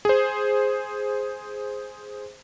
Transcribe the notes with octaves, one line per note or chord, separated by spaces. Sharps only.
G#4 C5